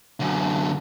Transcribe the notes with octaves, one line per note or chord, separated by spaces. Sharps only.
F#2 D3